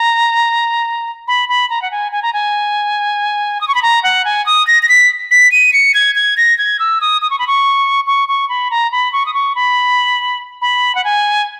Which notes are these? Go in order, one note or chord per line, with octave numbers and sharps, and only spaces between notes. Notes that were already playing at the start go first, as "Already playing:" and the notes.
Already playing: A#5
B5
B5
A#5
F#5
G#5
G#5
A#5
G#5
D#6
C#6
B5
A#5
F#5
G#5
D#6
A#6
A#6
B6
B6
D#7
C#7
G#6
G#6
A#6
G#6
E6
D#6
D#6
C#6
B5
C#6
C#6
C#6
B5
A#5
B5
C#6
D#6
C#6
B5
B5
F#5
G#5